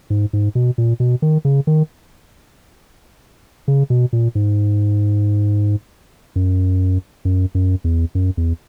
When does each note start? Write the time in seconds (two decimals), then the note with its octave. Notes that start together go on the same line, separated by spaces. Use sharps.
0.10 G#2
0.33 G#2
0.55 B2
0.78 A#2
1.00 B2
1.22 D#3
1.45 C#3
1.67 D#3
3.68 C#3
3.90 B2
4.13 A#2
4.35 G#2
6.36 F#2
7.25 F#2
7.55 F#2
7.84 E2
8.15 F#2
8.37 E2